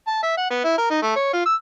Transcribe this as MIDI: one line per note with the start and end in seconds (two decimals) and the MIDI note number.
0.07 0.22 81
0.23 0.33 76
0.38 0.48 78
0.50 0.62 59
0.64 0.77 64
0.78 0.87 70
0.90 0.98 63
1.02 1.14 57
1.16 1.30 73
1.33 1.44 65
1.46 1.54 88